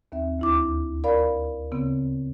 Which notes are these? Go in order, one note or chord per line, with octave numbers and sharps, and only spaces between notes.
D#2 C4 E5
D2 E4 D6
A#4 D5 F5 B5
C#3 B3 C4